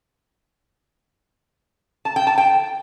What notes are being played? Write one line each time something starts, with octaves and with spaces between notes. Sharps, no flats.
A5
G5
A5
G5